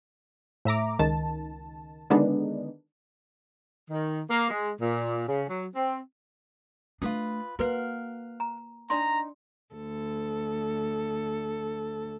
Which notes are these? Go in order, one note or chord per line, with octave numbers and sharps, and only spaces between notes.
A2 E5 A#5 D6
C#2 D#3 A5
D3 D#3 G#3 B3 D4 D#4
D#3
A#3
G#3
A#2
C#3
F#3
C4
A3 D4 F4 B4 D#6
A#3 F#4 A#4 B4 F5 F#5
A#5
D4 D#4 D5 A#5 C6
D2 A4